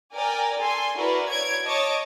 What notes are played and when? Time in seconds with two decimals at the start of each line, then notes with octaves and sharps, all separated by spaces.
0.15 A#4 D5 G5 G#5
0.60 A4 G#5 C6
0.97 E4 F#4 A#4 B4 D5
1.30 C#5 G#6 D7
1.65 C#5 D#5 A5 C#6 D6